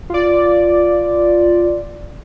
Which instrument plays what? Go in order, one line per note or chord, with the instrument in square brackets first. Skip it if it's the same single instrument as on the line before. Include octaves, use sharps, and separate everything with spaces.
[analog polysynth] F4 D5